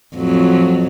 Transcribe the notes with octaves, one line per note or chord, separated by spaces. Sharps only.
F2 A2 F#3